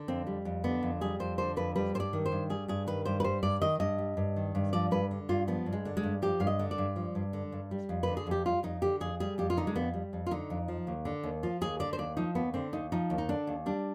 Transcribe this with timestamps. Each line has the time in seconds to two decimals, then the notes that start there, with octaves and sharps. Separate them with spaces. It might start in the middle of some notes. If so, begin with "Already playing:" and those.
Already playing: D3
0.08 F2 C4
0.27 G3
0.45 F2
0.64 D3 B3
0.83 F2
1.01 G3 G#4
1.20 F2 C5
1.38 D3 C5
1.56 F2 B4
1.76 G3 B4
1.95 G2 C5
2.00 D5
2.13 D#3
2.26 C5
2.32 G2
2.49 G3 G#4
2.68 G2 G#4
2.87 D#3 B4
3.05 G2 C5
3.20 B4
3.24 G3 C5
3.43 G2 D5
3.61 D#3 D#5
3.80 G2 D#5
3.98 G3
4.17 G2
4.36 D#3
4.55 G2
4.73 F3 D5
4.91 G2 B4
5.11 D3
5.29 G2 F4
5.48 F3 B3
5.66 G2
5.73 G#3
5.85 D3
5.97 G#3
6.03 G2
6.22 F3 G4
6.40 G2 F5
6.47 D#5
6.59 D3
6.71 D5
6.78 G2
6.96 F3
7.15 G2
7.33 D3
7.52 G2
7.71 G3
7.89 F2
8.03 D3 B4
8.17 G#4
8.26 F2 G4
8.45 G3 F4
8.63 F2 D#4
8.82 D3 G4
9.00 F2 G#4
9.20 G3 G#4
9.38 F2 G4
9.50 F4
9.57 D3 D#4
9.67 G#3
9.75 F2 B3
9.94 G3
10.13 F2
10.26 F4
10.31 D3 D#4
10.50 F2
10.68 F3
10.87 D#2
11.05 D3
11.24 D#2
11.43 F3 F4
11.61 D#2 G#4
11.80 D3 D5
11.93 C5
11.98 D#2 D5
12.17 F3 D#4
12.35 D#2 B3
12.54 D3 C4
12.73 D#2 D#4
12.92 F3 D#4
13.10 D#2
13.18 D#4
13.29 D3 D4
13.47 D#2
13.66 G3 D4